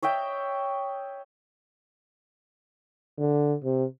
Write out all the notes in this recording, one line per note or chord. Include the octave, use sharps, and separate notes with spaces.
C#5 D#5 E5 G5
D3
C3